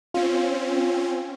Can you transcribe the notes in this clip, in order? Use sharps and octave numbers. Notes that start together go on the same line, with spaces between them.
C4 C#4 F4